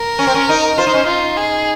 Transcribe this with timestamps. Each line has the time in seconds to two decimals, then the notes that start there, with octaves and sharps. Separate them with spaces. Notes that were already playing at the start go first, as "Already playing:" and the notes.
Already playing: A#4
0.19 C#4
0.27 C4
0.34 C#4
0.49 D#4
0.78 F4 C5
0.87 D#4
0.94 C#4
1.03 D#4 F4
1.37 G#4